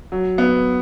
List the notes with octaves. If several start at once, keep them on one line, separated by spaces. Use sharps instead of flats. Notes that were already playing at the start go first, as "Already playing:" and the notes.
F#3
B3